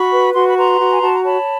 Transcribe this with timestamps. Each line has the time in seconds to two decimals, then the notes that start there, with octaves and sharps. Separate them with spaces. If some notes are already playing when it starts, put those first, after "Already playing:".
Already playing: F#4 B5 C#6
0.12 B4
0.34 F#4 C6
0.47 B5
0.57 B4 A#5 C6
0.80 F#4
0.91 G#5
1.02 F#4 A5
1.13 A#5
1.24 C#5 A5 B5